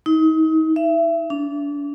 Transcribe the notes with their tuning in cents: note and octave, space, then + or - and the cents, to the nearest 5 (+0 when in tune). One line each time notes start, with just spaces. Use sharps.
D#4 +35
E5 +30
D4 -30